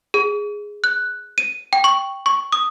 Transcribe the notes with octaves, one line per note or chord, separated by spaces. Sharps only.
G#4
F#6
D#7
G5
C#6
C#6
D#6